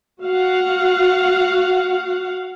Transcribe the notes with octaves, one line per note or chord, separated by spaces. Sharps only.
F#4 F5 F#5